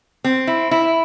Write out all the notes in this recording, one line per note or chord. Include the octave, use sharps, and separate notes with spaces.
C4
E4
E4